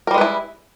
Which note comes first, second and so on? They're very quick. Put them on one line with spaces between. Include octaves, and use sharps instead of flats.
A#4 G3 G#3 B4 E4